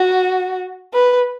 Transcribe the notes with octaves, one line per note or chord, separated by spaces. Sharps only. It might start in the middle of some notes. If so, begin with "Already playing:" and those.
Already playing: F#4
B4